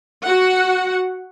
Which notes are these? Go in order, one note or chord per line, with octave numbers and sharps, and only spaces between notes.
F#4 F#5